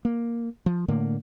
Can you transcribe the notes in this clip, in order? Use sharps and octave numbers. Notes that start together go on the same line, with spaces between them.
A#3
F3
A2 D3 A3 A#3